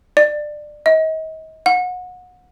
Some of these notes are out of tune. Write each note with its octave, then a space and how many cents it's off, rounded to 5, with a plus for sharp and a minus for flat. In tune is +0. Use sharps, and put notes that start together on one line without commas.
D5 +20
D#5 +35
F#5 -30